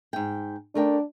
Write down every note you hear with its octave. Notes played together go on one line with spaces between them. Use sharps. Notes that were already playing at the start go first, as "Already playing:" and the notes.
G#2 G5
A3 D4 A#4 G5